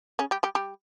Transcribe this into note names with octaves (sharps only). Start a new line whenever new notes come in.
C#3 C#4
G3 G4
G3 G4
G3 G4